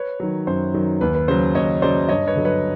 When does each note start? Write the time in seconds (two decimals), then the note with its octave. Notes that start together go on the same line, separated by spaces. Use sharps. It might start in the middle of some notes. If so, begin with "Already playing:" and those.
Already playing: B4 C#5
0.20 D#3 F#3
0.47 F#2 C5
0.74 D#3 F#3
1.01 D#2 B4
1.15 B4
1.28 C#3 F#3 C5
1.55 D#2 C#5 D#5
1.82 C#3 F#3 C5 D5
2.09 G2 C#5 D#5
2.27 B4 C#5
2.36 D3 F#3
2.45 B4 C#5